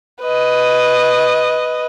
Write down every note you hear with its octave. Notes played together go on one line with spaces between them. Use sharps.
B4 D#5